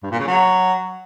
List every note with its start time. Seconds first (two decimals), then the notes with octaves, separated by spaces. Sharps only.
0.03 G2
0.11 A#2
0.19 C#3
0.28 F#3